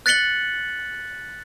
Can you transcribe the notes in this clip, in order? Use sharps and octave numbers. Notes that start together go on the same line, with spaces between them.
F#6 A6 B6 C#7 F#7 G7